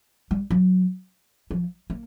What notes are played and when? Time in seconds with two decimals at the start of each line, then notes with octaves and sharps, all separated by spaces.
0.31 G3
0.50 F#3
1.51 F3
1.90 A#3